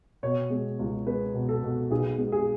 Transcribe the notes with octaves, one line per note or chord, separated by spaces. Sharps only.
B2 C#5
G#3
C#2
G#3 B4
B2
A4
B2
B1 G#4
G#3
G#4